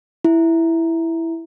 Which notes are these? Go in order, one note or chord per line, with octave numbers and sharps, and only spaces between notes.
E4